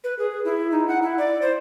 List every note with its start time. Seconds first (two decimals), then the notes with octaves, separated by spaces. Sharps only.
0.04 B4
0.19 G#4
0.45 E4
0.71 D#4
0.88 F#5
1.02 E4
1.18 D5
1.42 C5